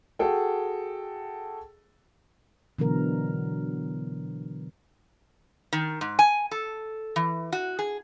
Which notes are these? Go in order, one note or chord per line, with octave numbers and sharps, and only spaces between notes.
F#4 G#4 A4 G5
B2 D3 E3 F#3 A#4
D#3
G#2
G#5
A4
E3
F#4
G#4